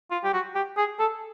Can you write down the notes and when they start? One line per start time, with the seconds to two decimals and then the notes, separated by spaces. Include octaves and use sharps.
0.11 F4
0.24 G4
0.33 F#4
0.55 G4
0.77 G#4
0.99 A4